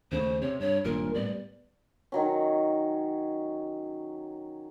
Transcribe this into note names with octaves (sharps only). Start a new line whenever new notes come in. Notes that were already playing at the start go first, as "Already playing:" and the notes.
D#2 C#3 A3 C5
C3 C#5
G2 C#5
G#1 G2 A#2 A#4
A2 G3 B3 D5
D#3 F#3 C#4